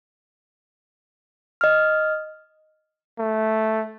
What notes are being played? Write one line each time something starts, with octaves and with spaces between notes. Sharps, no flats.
D#5 F6
A3